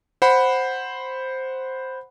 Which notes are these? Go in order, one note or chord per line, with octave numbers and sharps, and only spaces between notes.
C5 F#5 B5